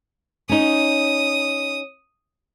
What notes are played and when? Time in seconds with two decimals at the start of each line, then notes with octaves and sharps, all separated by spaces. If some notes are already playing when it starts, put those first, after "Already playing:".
0.49 C#4 D#4 D#6